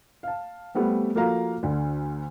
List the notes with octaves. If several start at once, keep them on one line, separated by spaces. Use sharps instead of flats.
F5 A5
G3 A3 B3 C4
F3 A#3 F#4 A4 F5 A#5
D2 D3